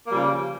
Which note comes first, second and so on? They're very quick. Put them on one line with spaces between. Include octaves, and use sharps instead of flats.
A#3 G3 F3 C#3